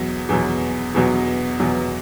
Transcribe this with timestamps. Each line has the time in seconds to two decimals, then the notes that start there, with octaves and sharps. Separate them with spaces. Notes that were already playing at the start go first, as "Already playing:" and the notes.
Already playing: E2 B2 F#3
0.29 E2 B2 F#3
0.95 E2 B2 F#3
1.60 E2 B2 F#3